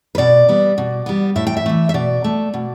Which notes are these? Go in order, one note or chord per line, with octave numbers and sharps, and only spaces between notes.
B4
B2 D5
G3 B3
B2
G3 B3
A2 E5
G5
E5
E3 A3
E5
B2 D5
A3
B2